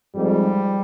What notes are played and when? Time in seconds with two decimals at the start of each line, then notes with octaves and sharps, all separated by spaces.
0.15 F2 G#2 G3